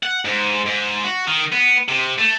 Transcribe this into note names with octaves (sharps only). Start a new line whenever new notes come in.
F#5
G#2
G#2
F#4
D#3
B3
C3
A3